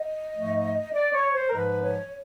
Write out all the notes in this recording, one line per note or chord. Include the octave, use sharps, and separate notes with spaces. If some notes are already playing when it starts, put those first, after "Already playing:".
Already playing: D#5
G#2 F3 A3
D5
C#5
C5
A#4
G#2 F3 G#3 B4
C#5